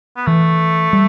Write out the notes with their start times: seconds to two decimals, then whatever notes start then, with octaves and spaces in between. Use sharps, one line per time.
0.17 B3
0.27 E3 A3
0.93 G3